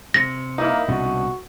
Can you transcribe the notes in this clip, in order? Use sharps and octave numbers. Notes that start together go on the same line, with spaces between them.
C3 A#6
A#3 D#4 E4
C2 B2 D3 F#4